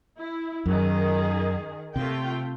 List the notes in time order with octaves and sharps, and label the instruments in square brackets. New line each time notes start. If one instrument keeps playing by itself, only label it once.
[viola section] E4
[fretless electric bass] F#2 [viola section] D#3 G#4
[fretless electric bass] C3 [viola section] A3 F4 G5